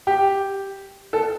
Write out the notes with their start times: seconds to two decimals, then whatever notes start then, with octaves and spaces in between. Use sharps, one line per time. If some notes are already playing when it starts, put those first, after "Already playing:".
0.07 G4
1.13 A4